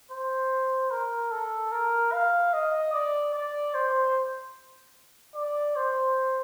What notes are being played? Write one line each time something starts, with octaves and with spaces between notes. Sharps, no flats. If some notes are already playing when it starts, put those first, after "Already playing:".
C5
A#4
A4
A#4
F5
D#5
D5
D5
C5
D5
C5